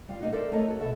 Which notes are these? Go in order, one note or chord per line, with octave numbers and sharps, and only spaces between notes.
G3 F4
A#3 D#4 F#4
A4 A#4 C5 D5 E5
A3 D#4 A4 A#4 C#5 D#5
F#4 A4
B2 A4 E5